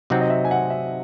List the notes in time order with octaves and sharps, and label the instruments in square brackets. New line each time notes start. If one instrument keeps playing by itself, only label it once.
[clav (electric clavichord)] C3 F#3 C4 D#4 [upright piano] F#5
[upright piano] D#5
E5
G#5
F#5
E5